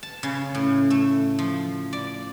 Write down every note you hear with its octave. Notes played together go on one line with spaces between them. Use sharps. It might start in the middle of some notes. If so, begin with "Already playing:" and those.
A5
C#3
A2
A3
F3
D5